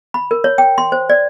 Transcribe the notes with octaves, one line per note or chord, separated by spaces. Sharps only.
B5
A#4
C#5
G5
C6
C5
D5